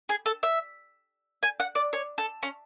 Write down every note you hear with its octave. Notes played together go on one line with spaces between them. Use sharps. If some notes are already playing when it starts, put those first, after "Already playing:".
G#4
A4
E5
G#5
F#5
D5
C#5
A4
C#4